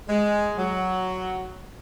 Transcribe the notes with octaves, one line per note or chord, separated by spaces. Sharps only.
G#3
F#3